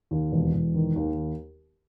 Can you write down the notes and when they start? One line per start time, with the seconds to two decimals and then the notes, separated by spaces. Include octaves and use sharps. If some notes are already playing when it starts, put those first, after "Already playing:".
0.11 D#2
0.32 E1
0.54 E1
0.74 D#3
0.96 D#2